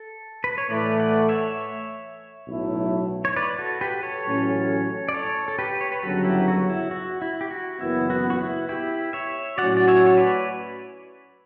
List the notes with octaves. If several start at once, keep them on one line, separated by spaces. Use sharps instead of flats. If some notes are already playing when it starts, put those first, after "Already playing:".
Already playing: A4
B4
C#5
A2 E3 A3 B4 D5
D5 F#5
C#5 E5
B1 A2 F#3 A3 E4
C#5
B4 D5
F#4 A4
G4 B4
A4 C#5
A1 A2 F#3 C#4
D5
A4 C#5
A4
G4 B4
C#5
B4
G1 F#2 C#3 F#3 F#4 A4
E4 G4
F#4
E4
F#4
E4
G4
F#4
F#1 F#2 E3 B3 E4
F#4
F#4
E4
E4 G4
C#5 E5
A2 F#3 C#4 F#4 D5 F#5
D5
C#5 E5
C#5
B4 D5